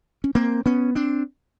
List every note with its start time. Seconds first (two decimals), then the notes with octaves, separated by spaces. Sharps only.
0.24 C#4
0.35 A#3 C4
0.66 B3 C#4
0.95 C4 D4